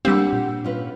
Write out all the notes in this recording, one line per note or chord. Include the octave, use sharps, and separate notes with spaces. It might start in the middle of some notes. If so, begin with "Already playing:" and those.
G3 A#3 C4 D4 G4 F#5 E6
A#2
C#4 F4 B4